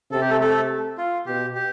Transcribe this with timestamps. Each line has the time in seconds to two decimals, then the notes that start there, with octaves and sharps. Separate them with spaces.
0.12 C3 A4
0.21 G4
0.30 A3 A4
0.40 A3 A4
0.98 F4
1.26 B2 G4
1.55 G4